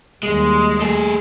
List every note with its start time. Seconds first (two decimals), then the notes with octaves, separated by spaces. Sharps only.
0.23 D#2 G3 G#3
0.80 A3 G#4